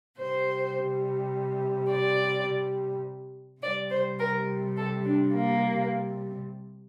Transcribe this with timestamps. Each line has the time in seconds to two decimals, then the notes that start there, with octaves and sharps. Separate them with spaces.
0.19 C3 G3 C5
1.91 D5
3.62 C3 G3 D5
3.90 C5
4.19 A#4
4.76 A4
5.04 D4
5.33 A#3